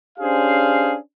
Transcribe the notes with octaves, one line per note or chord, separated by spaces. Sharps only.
C#4 D4 G4 G#4 C5 F5